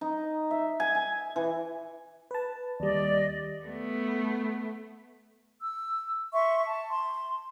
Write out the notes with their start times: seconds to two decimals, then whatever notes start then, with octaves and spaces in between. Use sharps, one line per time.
0.01 D#4
0.51 E5
0.80 G#5
0.95 G#5
1.36 E3
2.31 B4 A5
2.80 D#2 G3 D5 D#5
3.64 A3 B3
5.60 E6
6.33 E5 C6 C#6
6.64 A5
6.89 C6